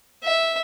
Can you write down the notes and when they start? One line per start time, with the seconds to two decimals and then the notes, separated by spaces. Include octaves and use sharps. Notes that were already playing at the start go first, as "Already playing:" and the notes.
0.24 E5